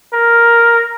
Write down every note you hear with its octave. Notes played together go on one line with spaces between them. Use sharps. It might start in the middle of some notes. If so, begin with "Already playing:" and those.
A#4